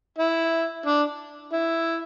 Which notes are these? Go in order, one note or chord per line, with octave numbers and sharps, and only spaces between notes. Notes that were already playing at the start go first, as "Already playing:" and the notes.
E4
D4
E4